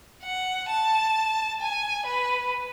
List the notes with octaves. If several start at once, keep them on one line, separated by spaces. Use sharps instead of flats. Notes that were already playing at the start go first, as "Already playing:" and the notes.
F#5
A5
G#5
B4